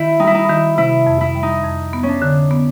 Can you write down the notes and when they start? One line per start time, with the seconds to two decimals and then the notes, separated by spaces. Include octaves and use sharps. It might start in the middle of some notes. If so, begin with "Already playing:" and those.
Already playing: D#3 E4
0.20 G3 D#4
0.27 E4
0.35 D#4
0.49 D#3 E4
0.78 C3 E4
1.07 F2
1.21 E4
1.35 G3
1.43 D#4
1.64 F2
1.93 B3
2.03 C#4
2.08 D4
2.22 D3
2.51 B3